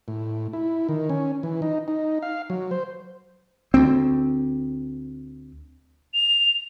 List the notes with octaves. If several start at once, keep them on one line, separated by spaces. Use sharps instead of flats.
A2
E4
D#3
C#4
E3
D#4
D#4
F5
F#3
C5
D2 C4
F7